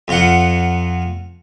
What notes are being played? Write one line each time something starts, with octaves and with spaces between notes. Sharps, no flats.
F2 F4 F#5